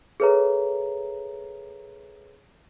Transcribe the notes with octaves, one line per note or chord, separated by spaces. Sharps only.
G#4 A4 B4 C#5 E5 A#5